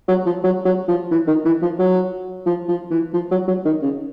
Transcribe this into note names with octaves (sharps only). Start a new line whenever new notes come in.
F#3
F3
F#3
F#3
F3
E3
D#3
E3
F3
F#3
F3
F3
E3
F3
F#3
F#3
D#3
C#3